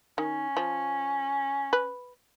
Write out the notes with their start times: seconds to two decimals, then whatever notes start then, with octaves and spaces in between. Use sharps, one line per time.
0.18 D#3 C#4
0.57 F3
1.73 B4